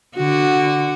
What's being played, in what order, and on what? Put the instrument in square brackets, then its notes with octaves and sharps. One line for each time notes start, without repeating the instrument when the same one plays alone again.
[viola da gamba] D3 F#4